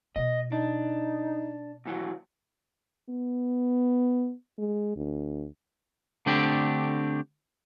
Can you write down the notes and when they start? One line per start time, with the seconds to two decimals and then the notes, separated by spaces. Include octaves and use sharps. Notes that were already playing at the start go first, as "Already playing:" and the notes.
0.16 B2 B3 D#5
0.52 D4 D#4
1.85 D#2 E3 F#3
3.09 B3
4.58 G#3
4.96 D2
6.26 D3 A3 C4 D4 G4